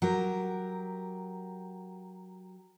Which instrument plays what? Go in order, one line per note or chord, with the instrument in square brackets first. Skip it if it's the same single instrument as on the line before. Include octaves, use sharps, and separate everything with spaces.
[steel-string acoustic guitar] F#3 G4 A#4